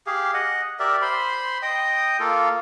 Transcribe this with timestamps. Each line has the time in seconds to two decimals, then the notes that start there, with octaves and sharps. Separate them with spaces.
0.07 G4 G#4 F5
0.34 D#5 F#5
0.80 G4 A#4 D5 E5
1.02 C5 B5 C6
1.62 D#5 G5 D#6
2.20 A#3 F4 A4